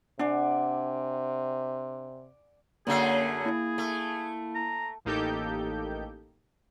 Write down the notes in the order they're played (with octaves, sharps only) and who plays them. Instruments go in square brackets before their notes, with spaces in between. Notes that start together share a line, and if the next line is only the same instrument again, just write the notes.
[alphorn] C3 [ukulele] D4 [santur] D5 F#5 G#5
[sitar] F#2 D3 A3 [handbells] A#3 C7 [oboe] G#4
[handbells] A#3 E4
[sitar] A3
[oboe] A#5
[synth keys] A1 A#3 D#4 G4 A4 G6